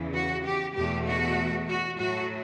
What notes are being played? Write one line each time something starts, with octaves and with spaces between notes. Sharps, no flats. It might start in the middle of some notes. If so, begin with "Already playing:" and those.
Already playing: E2 C#3 E3
F#4
G4
E2 B2 A3 G4
F#4
F#4
A2 F#3 A3 F#4